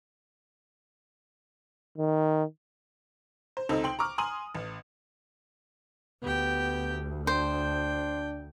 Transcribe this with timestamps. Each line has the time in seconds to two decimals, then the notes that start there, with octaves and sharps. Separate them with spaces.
1.98 D#3
3.57 C5
3.69 C#2 C3 D#4 A4 C5
3.84 G5 C6 F#7
3.99 A#5 C#6 D6 F6
4.18 G#5 A#5 C6 D#6 D#7 F#7
4.55 A1
6.23 D2 B3 G4 G5
7.27 D4 C5 G5